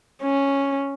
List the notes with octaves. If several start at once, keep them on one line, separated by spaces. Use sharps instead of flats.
C#4